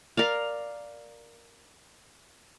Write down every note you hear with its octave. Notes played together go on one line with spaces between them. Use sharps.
A#4 D5 F5